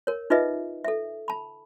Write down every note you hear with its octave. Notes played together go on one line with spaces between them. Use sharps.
A#4 C#5
D#4 F4 G#4 B4 D#5 E5
A4 E5
A5 B5